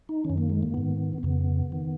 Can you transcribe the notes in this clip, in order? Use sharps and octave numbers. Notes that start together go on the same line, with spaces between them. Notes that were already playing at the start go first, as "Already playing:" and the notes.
D#4
D#3 C#4
F#2
A#3
G#3
A#3
G#2 D#3 B3
F2 C#3 B3
D#3